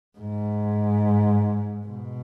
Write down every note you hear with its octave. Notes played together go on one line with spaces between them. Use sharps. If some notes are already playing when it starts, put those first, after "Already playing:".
G#2
B2